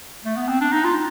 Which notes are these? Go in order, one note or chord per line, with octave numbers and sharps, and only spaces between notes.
A3
B3
C4
D4
D#4
F4